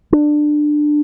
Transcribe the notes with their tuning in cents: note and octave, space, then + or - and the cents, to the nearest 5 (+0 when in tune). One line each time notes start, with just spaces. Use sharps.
D4 +20